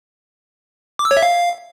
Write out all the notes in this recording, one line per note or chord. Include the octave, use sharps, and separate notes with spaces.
D6
E6
C#5
E5
F5